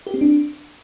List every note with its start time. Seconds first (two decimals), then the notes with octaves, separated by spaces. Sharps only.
0.07 G4
0.14 C4
0.21 D4